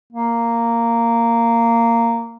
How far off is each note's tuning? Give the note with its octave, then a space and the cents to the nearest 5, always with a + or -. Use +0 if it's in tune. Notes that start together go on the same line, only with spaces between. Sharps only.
A#3 -10